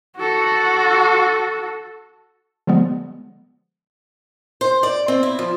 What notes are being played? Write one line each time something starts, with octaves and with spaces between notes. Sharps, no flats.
F#4 A4
D3 F3 G3 G#3 B3
C5
D5
C4
E4
F3